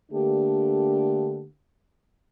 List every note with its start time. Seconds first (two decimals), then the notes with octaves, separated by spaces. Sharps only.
0.12 D3 A3 A#3 D4 G4